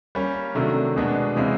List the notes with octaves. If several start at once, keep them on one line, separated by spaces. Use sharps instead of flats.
G3 A#3 C#4
C3 D#3 F#3 A3 D4
B2 G#3 B3 D4 F#4
C3 E3 G#3 C4 F4